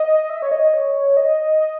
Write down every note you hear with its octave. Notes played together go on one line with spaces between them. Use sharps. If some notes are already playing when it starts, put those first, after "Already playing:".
Already playing: D#5
E5
C#5
D#5
C#5
D#5
D#5